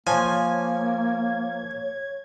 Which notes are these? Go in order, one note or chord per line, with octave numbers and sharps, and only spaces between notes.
F3 A#3 C#5 G#5 G#6